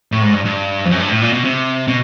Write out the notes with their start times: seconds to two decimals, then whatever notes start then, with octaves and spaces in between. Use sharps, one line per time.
0.12 A2
0.22 G#2
0.34 G2
0.45 G2
0.85 F2
0.92 F#2
1.00 G2
1.11 A2
1.22 A#2
1.33 B2
1.44 C3
1.88 B2